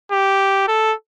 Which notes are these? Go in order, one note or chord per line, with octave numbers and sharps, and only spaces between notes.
G4
A4